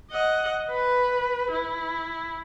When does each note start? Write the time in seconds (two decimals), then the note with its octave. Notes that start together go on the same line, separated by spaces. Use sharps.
0.11 D#5 F#5
0.71 B4
1.52 E4